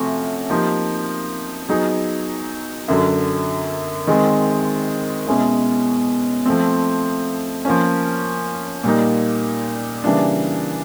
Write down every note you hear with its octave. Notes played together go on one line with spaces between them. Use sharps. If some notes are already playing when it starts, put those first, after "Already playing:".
Already playing: C3 F3 A3 C#4 F#4
F3 A#3 D#4 G4
F#3 B3 D#4 G#4
F#2 D3 F#3
D#3 G#3 C4
B2 G#3 C#4 E4
F3 A3 C4
F3 A#3 C#4
A#2 G3 A#3 D#4
C#3 E3 G3 A#3 D4